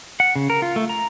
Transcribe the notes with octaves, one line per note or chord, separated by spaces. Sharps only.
F#5
C#3
A#4
F4
A3
A#5